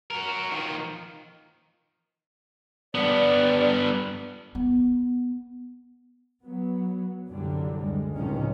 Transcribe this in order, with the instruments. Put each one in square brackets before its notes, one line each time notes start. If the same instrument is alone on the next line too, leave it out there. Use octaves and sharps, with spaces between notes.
[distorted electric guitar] F#4 A#4
D#3 F3
[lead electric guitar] G2 B3 [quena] D5
[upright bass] B3
[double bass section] F#3 B3
C2 F#2 D3 F#3 G3
D2 G3 G#3
C#2 A2 C3 D#3 F3 C#4